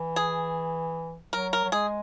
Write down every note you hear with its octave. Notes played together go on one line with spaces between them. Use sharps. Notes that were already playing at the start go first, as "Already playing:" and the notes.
Already playing: E3
G#4
F#3 A#4
A#4
F#3
G#3 G#4